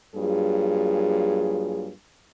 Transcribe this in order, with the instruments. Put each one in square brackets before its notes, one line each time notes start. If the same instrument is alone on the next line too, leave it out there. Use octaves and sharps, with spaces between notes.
[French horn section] G2 F#3 A#3 F4 G#4